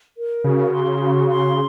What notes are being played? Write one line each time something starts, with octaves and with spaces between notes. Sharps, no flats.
A#4
C#3 F#4
C6
F#4
C6